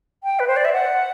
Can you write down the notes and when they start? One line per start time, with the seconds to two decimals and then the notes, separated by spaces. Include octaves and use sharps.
0.23 G5
0.39 B4
0.47 C5
0.56 D5
0.65 E5
0.73 F#5